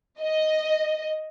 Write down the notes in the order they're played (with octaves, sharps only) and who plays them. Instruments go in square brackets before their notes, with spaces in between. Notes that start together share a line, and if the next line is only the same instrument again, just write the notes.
[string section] D#5